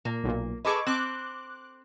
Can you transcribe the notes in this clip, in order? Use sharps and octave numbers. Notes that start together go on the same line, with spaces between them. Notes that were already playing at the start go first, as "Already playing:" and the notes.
A#2 A#3
B1 A#2
G#4 A4 B4 D#5 C#6 D6
C4 D6 F#6